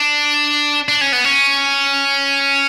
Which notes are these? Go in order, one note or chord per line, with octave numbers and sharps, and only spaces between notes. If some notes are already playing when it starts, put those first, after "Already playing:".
Already playing: D4
D4
C#4
B3
C#4